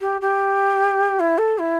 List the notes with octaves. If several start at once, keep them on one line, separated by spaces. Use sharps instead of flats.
G4
G4
E4
A4
E4